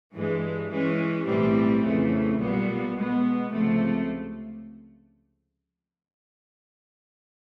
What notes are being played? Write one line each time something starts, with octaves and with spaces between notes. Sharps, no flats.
G2 E3 G#3
E3 G#3 C#4
B1 A2 E3 G3 C4
F2 C#3 E3 A3
B1 A#2 G3 B3
B2 G#3 B3
C#2 C3 F3 A3